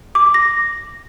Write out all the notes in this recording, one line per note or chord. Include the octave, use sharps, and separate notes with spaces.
D6
A#6